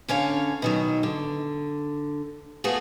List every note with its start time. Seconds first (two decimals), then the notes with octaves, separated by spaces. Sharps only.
0.08 D3 C#4 C#5 F5
0.62 B2 D#3 F#3
1.03 D3
2.64 A3 B3 F4 F#4 G#4